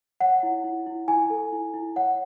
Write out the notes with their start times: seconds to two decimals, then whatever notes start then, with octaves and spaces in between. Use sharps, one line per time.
0.20 C#5 F#5
0.43 E4
0.64 E4
0.86 E4
1.08 E4 G#5
1.30 A4
1.52 E4
1.74 E4
1.96 C#5 F#5